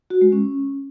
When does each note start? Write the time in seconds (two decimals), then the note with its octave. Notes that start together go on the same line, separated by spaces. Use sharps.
0.10 F#4
0.21 G#3
0.32 C#4